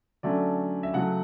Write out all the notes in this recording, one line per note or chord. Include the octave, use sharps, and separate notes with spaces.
D3 F#3 A3 C#4 D5
E5
C#3 F#3 A3 F#5